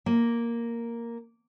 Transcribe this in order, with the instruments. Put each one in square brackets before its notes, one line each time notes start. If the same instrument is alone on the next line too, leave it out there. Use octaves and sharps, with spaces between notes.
[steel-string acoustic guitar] A#3